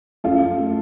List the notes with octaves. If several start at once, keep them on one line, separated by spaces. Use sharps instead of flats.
F#2 F4 A4
F#2
A3